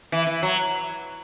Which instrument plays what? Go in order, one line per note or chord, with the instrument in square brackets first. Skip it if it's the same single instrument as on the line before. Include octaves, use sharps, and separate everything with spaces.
[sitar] E3
E3
F#3